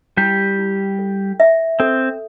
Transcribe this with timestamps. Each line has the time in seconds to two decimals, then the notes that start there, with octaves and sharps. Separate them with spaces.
0.17 G3 E4 G4
0.59 E4
0.99 A4
1.40 E5
1.80 C4 A4